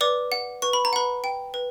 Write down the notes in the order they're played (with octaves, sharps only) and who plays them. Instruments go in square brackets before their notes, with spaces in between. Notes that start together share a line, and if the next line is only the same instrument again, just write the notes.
[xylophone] B4 D5 D6
F#5
B4 C#6
B5
A#5
B4 F#5 B5
G5
B4